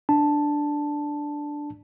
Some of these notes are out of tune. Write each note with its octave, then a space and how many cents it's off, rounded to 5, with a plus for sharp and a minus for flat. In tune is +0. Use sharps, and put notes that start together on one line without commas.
D4 +0 A5 +0